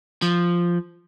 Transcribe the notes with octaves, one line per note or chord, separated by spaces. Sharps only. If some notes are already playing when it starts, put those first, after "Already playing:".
F3